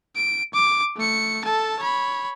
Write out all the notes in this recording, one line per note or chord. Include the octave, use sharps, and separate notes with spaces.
D7
D6
A3 C#7
A4 A5
C#5 B5